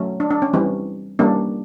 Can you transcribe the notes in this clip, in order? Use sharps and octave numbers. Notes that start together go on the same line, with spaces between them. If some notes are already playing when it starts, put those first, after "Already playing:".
Already playing: F#3 A3 C#4
D4
D4
C#4
E3 G3 C4 C#4
E3 G3 A#3 C#4 D4